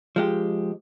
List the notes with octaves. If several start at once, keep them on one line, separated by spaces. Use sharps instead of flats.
F3 G#3 G4